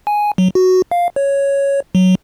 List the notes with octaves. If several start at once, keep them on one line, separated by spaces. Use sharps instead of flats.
G#5
F#3
F#4
F5
C#5
F#3